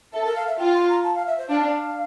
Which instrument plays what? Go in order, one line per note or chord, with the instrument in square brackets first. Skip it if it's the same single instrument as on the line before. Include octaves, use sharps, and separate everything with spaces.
[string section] A4 [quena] E5
[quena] A#4
F5
E5
[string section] F4 [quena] G5
[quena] C6
A#5
A5
F5
E5
C5
[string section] D4 [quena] F5